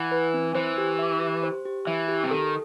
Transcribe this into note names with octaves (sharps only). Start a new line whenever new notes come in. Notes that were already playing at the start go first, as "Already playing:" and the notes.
Already playing: E3 F#5
B4
C4
E3 C5
G4
E5
G4
C5
G4
E3 E5
G4
C3
D#3 A4